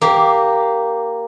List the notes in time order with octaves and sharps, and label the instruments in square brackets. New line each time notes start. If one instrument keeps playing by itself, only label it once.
[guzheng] A#3 G4